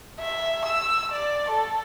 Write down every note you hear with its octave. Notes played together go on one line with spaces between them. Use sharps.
E5
E6
D5
A4